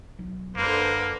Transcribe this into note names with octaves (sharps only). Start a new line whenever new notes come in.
B1 F#3
F#2 D3 A#3 B4 C5